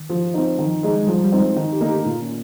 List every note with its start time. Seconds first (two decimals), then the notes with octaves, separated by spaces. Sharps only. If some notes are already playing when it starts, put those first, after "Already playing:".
Already playing: D#3
0.10 F3
0.34 C4 D#4
0.58 D#3 F3
0.83 G#3 D#4
0.96 G#3
1.07 F3 G3
1.24 G3
1.32 C4 D#4
1.39 G#3
1.56 D#3 D#4
1.73 G4
1.81 A#3 D#4
1.88 G4
2.05 A#2 F4
2.21 C#4